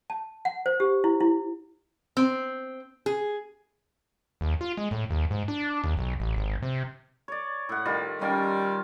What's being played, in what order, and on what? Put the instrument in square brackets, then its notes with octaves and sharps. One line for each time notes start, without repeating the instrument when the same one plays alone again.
[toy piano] A5
F#5
C5
G4
E4
E4
[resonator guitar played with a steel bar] C4
G#4
[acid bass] D#2
F4
G#3
A2
D#2
G#2
D4
D#2
B1
A1
G#1
C3
[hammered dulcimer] C#5 D5
A2 F#5
D#3 G3 F4
[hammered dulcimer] D#3 C#4 F4 [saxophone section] G3